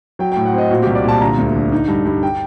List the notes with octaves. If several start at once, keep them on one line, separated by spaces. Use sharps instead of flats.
F#3 G5
A2 G5
F#5
C4 D#5
A#2 F#4
C2 G4
D5
A#2 A5
D3 A#5
D2
D3
D#4
G2
G2
G5